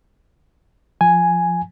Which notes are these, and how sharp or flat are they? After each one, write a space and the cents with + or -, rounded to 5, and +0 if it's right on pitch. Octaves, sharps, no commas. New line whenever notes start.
F3 +0 G#5 +0